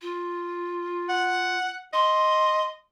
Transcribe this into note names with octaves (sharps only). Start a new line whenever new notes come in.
F4
F#5
D#5 C6